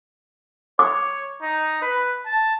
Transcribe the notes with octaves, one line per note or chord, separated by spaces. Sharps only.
C#5 D6
D#4
B4
A5